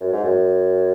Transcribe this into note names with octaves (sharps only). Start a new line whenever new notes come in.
F#2
G#2
F#2